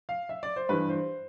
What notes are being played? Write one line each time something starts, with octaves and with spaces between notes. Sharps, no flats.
F5
E5
D5
C5
G2 E3 B4
C5